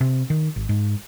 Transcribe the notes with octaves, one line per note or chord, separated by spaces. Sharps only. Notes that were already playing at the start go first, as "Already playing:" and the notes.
C3
D#3
G#1
G#2